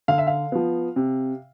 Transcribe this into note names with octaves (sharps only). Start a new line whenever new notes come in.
D3 F5
E5
F5
F3 B3
C3